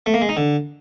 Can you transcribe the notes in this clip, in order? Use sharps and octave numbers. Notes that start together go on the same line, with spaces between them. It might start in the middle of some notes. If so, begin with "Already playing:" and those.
A3
A#3
G#3
D#4
D3